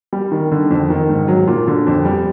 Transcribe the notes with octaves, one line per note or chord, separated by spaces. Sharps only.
G3
D#3
D3
F2
D#3
G#2
F#3
A#2
D3
F2
G3